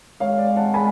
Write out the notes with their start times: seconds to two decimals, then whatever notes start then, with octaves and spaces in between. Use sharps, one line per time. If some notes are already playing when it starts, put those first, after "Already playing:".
0.20 G#3 C#5 F5
0.38 D5
0.56 F#5 A5
0.74 G#5 B5